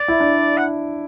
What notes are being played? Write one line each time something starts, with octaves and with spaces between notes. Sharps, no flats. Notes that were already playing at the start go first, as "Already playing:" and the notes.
Already playing: D5
E4
D4
F#5